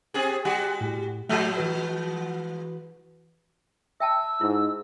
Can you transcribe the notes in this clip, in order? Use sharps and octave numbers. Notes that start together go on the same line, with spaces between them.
C4 G4 G#4
G3 F#4 G4
A2
F3 G#3 A3 F#4
E3 F#4 B4
E5 G5 A5 E6
G#2 E4